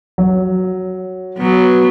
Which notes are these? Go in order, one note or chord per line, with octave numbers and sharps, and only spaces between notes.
F#3
F#3 B3